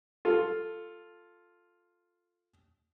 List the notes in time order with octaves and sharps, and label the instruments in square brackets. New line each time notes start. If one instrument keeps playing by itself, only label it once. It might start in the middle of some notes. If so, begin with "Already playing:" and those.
[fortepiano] F4 A4